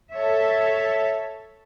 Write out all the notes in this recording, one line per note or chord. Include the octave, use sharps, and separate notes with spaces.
A4 C#5 E5